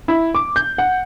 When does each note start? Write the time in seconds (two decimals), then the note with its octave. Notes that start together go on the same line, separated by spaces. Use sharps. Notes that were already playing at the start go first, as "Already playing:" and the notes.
0.08 E4
0.35 D6
0.56 G6
0.78 F#5